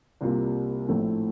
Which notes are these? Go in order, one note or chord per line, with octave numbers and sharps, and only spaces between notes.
C2 C3 G3 A#3 F4
A#1 A2 A3 C4